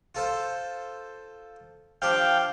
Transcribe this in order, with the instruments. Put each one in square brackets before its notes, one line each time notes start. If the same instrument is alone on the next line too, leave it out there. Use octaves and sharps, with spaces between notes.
[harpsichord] F4 A4 C5
[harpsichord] F3 D4 G4 [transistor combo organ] F5 G5